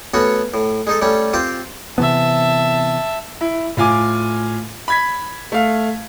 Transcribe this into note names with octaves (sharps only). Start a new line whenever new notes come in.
A3 B3 C#4 F#4
A2
G#3 D#4 A4
G3 A3 C#4
C4 F4 G4 C5
C3 E3 B3 E5 A5
E4
A2 F4 G#5 D6
B5 G#6 B6
A3 F5